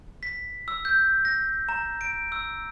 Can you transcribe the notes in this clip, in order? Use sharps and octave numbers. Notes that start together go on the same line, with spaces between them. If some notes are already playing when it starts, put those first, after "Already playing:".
B6
E6
G6
A#6
A#5
D7
E6